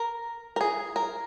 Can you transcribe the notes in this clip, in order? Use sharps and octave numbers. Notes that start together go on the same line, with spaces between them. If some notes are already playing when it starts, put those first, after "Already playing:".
Already playing: A#4
A#4
G#4
A#4